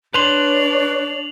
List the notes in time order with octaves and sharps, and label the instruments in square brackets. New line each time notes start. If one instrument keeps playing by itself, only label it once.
[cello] D4 [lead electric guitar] B4 C6 [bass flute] C#5 [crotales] F7 F#7